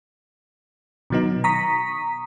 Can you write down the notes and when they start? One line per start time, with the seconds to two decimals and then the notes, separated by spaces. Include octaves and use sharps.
1.10 B2 D#3 F#3 B3 D#4
1.44 A#5 C#6 D#6 B6